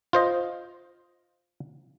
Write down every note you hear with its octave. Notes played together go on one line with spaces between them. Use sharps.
F4 C5 D#5